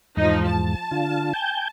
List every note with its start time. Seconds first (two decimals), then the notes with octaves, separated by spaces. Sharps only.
0.17 E2 G#2 F3 D#4
0.48 A5
0.91 D3 F4
1.33 G5 G#5 G6